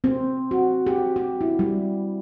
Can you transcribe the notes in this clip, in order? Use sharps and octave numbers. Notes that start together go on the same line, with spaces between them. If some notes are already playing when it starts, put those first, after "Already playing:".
C4
F#4
G4
G4
E4
G3